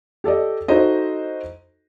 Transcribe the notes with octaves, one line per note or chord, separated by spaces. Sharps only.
G4 A4 D5 D#5
D#4 E4 F#4 A4 C5 D#5